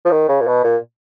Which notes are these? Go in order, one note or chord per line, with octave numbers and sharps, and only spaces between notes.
F3
D#3
C#3
A#2
B2
A#2